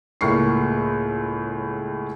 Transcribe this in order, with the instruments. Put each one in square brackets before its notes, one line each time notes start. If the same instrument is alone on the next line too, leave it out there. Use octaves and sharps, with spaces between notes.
[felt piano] C#2 A2 A#3 C#6 C7